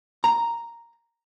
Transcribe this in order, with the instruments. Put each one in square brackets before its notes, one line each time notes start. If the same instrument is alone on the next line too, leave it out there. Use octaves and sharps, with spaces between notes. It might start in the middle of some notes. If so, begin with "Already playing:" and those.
[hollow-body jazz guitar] A#5